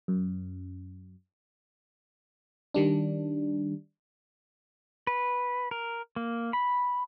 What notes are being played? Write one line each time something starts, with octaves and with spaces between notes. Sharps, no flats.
F#2
D#3 G3 D4
B4
A#4
A#3
B5